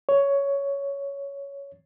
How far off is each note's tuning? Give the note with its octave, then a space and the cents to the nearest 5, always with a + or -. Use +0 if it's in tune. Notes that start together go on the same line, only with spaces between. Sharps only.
C#5 +10